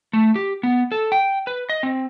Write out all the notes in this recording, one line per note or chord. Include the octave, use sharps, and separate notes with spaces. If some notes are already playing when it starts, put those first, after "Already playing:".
A3
G4
B3
A4
G5
B4
D#5
C4